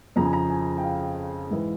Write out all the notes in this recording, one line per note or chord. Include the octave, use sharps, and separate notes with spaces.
F2 C#3 F3 A#5
G#5
A#5
G#5
G5
F5
G#2 E3